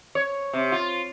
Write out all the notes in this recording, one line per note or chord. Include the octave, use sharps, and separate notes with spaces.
C#5
C3
F4